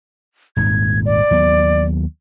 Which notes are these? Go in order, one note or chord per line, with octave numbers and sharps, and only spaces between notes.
D#1 G#1 G#2 G#6
D5
D#2 F#3 B3